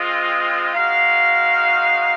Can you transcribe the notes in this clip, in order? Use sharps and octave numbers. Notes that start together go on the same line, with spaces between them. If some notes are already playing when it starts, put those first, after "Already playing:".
Already playing: G#3 C4 F4 D#5
G#3 D#4 F#4 F5